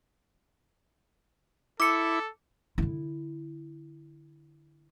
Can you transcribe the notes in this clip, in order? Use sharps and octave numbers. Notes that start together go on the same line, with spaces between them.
E4 A4 D6 C#7
D3 E4